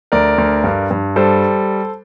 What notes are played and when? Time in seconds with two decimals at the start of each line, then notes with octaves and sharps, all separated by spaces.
0.12 D2 A#4 D5
0.38 D2
0.64 G2
0.91 G2
1.16 G3 A4 C5